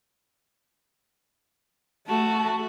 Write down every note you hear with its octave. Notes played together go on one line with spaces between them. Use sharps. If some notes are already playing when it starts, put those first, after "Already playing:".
A3 F#4 A5